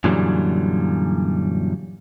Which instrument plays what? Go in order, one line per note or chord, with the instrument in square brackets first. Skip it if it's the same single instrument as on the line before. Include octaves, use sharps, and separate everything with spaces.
[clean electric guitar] F#2 A#2 D3 E3 F#3 G3